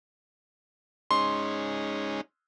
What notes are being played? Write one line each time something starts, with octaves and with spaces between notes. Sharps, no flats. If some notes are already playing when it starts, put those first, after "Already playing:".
G#3 C#4 D#4 C6